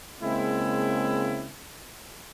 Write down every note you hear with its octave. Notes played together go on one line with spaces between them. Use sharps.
C#3 G#3 A#3 C4 E4